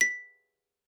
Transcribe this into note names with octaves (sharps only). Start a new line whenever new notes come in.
B6